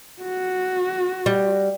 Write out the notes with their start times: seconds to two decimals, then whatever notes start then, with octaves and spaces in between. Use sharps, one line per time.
0.22 F#4
1.26 G3